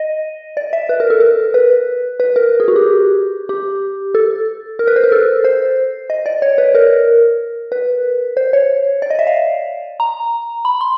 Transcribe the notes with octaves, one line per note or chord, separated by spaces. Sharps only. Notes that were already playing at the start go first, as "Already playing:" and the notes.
Already playing: D#5
D5
E5
B4
A#4
A4
A#4
B4
B4
A#4
G#4
F#4
G4
G4
A4
A#4
B4
C5
A#4
A4
C5
D#5
D5
C#5
B4
A#4
B4
C5
C#5
D5
D#5
E5
F5
A#5
B5
C6